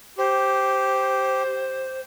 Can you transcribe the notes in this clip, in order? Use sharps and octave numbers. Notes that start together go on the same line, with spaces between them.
G4 C5